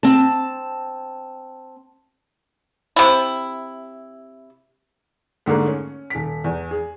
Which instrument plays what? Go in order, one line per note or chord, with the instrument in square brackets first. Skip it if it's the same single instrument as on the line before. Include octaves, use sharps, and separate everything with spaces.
[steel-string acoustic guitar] C4 A5
[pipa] C3 E4
[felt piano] G#2 D3 A3 A#3
C#4
D#1 B6
E2
G#4